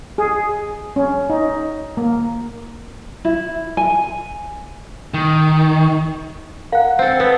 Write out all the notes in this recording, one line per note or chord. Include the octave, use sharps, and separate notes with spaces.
G#4
C#4
D#4
A#3
E4
G#5
D#3
A#4 F5 F#5
C4 A4
B3